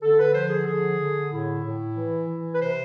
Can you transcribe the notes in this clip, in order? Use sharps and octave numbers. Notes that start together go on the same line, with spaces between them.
D3 A4
B4
F3 C5
G#4
A4
D3 G#4
D3
A2 E4
A2
E3
E3
B4
C3 C5